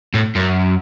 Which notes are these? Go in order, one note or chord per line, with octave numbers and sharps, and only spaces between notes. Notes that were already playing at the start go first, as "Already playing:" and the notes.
A2
F#2